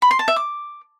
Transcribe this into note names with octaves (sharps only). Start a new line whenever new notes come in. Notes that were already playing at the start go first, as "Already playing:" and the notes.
B5
C6
A5
E5
D6